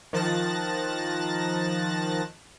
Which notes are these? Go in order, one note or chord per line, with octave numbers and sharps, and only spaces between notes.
D#3 F3 A5 F#6 A6 A#6